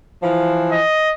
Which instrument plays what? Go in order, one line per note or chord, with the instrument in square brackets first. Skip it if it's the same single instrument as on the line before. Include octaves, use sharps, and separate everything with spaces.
[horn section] E3 F3
[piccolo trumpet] D#5